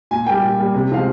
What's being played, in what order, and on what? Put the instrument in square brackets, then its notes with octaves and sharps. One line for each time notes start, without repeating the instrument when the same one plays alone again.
[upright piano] A#2 G#5
G3 A#3 G5
A#2
G3 A#3
C3
F3 G#3 C4 F5